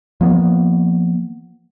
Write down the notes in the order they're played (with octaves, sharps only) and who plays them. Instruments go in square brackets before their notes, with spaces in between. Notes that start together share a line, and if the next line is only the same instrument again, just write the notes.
[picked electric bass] F3 A#3 B3